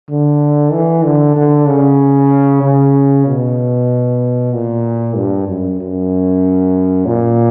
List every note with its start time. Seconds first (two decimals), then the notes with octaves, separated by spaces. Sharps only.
0.10 D3
0.73 E3
1.04 D3
1.36 D3
1.67 C#3
2.63 C#3
3.26 B2
4.53 A#2
5.17 G2
5.48 F#2
5.80 F#2
7.06 A#2